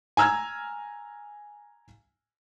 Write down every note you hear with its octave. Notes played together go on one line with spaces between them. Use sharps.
G#5 A#5 E6 F6 G#6